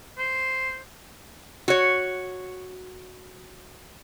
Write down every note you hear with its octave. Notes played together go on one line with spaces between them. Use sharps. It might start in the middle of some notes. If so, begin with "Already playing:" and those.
C5
F#4 C#5